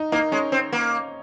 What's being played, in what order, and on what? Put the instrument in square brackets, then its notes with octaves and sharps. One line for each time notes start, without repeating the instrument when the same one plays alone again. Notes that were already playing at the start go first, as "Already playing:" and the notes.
Already playing: [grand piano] D#4
[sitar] A#3 [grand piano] D#4
[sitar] G#3 [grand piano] C#4
[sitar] C4
A#3